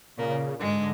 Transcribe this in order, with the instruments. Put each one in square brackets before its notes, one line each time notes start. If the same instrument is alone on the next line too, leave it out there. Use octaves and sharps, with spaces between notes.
[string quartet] A#2 A#3 [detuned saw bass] C#3
[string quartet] G#2 G#3 [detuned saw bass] D3